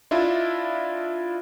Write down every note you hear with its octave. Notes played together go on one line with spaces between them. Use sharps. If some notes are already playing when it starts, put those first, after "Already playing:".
D4 E4 F4 D#5 E5